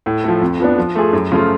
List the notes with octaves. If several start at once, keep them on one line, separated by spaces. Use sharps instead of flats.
A2
F3 A3
F2
F3 B3 D4
F3
A3 F4 G#4
F#2
C#3 F3 A3 F4